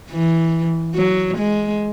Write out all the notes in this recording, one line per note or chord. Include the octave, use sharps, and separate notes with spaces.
E3
F#3
G#3